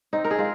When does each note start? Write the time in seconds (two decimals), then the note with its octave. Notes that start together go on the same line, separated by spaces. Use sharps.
0.13 C4 D#4
0.24 A#4
0.31 G#4
0.39 G#3 F4